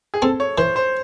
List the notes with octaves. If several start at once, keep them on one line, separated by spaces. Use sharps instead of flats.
G#4
C4 A4
C#5
E3 C5
C5